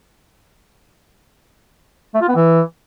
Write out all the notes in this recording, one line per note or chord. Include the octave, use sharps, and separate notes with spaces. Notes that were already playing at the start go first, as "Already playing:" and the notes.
A3
F4
B3
E3